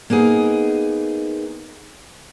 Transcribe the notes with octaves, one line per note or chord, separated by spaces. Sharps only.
A#3 B3 D#4 G#4